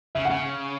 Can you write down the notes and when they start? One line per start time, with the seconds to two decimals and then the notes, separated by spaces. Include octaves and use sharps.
0.15 C#3 E5
0.25 F#5
0.30 C#3